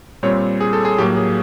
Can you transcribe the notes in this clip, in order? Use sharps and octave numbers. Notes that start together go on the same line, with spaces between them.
A#2 G3 C4 C#5
G#4
A4
G#4
A2 F#3 A#3 G4
G#4